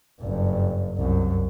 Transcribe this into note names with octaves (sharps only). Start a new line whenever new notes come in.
F#1 G2
C2 F#2